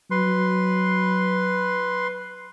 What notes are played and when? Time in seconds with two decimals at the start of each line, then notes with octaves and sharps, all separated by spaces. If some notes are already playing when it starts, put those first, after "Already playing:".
0.11 F#3 B4 C6